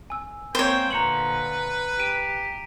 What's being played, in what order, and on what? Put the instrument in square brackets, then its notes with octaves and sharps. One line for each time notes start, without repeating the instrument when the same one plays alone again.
[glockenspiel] G#5 E6
[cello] A#3 C4 [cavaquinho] C5 C#5 [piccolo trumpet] G5
[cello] A#2 D3 [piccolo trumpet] B4 [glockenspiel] A#5 C#7 F#7
[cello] G4 [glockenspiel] D7 D#7